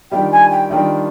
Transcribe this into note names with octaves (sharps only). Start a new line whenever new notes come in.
D#3 G3 D4 F4 G5
G#5
G5
D#3 G3 D4 F4 G5